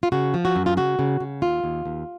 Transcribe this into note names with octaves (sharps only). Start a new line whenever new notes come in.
F4
C#3 F#4
F3
F#4
F#2
F4
C#3 F#4
C#3
C#3
D#2 F4
D#2
D#2